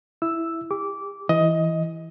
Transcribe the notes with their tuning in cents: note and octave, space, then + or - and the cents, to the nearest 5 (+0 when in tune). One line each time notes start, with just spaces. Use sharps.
E4 +0 E6 +0
G4 +40 D6 -15
E3 +0 D#5 +15